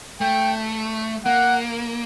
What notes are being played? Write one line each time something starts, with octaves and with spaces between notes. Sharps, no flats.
A3 G5
A#3 F#5